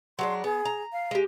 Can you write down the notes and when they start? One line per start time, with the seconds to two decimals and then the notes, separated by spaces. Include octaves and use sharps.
0.19 F#3 G#3 D4 C6
0.44 B3 G#4
0.65 A#5
0.93 F5
1.11 G#3 G4